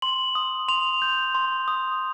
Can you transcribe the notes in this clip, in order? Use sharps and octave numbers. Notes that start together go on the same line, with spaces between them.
C6 F#7
D#6
C6 F7
G6
C6
D#6